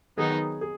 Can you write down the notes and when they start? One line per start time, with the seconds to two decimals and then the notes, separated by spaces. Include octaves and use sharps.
0.17 D#3 F#3 B3 D#4 G#4
0.61 G#4